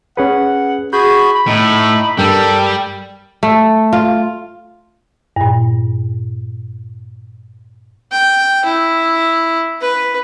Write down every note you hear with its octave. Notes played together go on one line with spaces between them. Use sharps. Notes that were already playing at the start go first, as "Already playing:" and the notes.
C#4 G#4 B4 F#5
F#4 G#4 B5 G6
B5
A2 D#4
G2 G3 A4 A#4 G5 G6
A3
F4
G2 A#2
G5
E4
B4